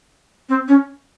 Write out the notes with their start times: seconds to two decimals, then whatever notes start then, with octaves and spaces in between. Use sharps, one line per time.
0.49 C4
0.68 C#4